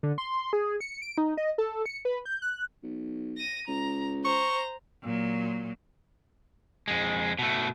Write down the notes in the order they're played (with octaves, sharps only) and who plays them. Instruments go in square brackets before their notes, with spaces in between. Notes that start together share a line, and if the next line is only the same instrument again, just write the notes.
[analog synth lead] D3
C6
G#4
C#7
D7
D#4
D#5
A4
C#7
B4
G6
F#6
[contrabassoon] B1
[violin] A#6 D#7
[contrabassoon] C#2 [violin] A#5
[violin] C5 A#5 [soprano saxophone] C#6
[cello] A#2 F#3
[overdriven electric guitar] F2 G#3
B2 A3